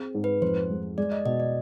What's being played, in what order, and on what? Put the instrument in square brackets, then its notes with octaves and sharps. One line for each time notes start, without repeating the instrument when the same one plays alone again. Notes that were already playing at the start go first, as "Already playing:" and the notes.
Already playing: [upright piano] C4 G#4
G#2
[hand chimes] B4
[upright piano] F2 [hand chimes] C5
[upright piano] G#3
[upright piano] G#3 [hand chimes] D5
[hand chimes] D#5
[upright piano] B2 [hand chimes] D#5
[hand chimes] D5